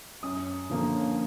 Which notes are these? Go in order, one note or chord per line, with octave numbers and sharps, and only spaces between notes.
F#2 D#6
D3 F3 A#3 C#4